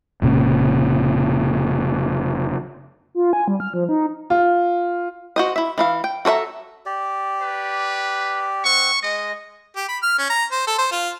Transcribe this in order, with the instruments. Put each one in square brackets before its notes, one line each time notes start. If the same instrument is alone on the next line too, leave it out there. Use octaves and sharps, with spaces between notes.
[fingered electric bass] F1 A#2 C#3
[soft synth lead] F4
G#5
G3
F6
F3
D#4
[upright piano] F4
[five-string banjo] F#4 C5 D#5
E4 E5
E3 E4 F5
G5
F#4 A4 C#5 E5 A#5
[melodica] G4 D5
[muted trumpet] B4
[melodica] C4 F#5 [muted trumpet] C#6
[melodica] G#3 [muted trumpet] D#5
[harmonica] G4
B5
F6
C#4
A#5
C5
A4
C5
F4